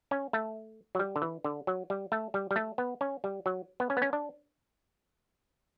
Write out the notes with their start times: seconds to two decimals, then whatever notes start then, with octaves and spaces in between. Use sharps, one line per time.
0.11 C#4
0.33 A3
0.95 F#3
0.99 G3
1.16 D3
1.22 E3
1.45 D3
1.67 F#3
1.90 G3
2.12 A3
2.34 G3
2.51 G3
2.56 A3
2.78 B3
3.01 C#4
3.24 G3
3.46 F#3
3.80 B3
3.90 C#4
3.97 B3
4.02 C#4
4.13 D4